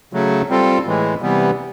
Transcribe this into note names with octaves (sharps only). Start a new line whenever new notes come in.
C#3 F#3 A3
G3 C4 F4 A4
A2 E3 G#3
C3 E3 G3 B3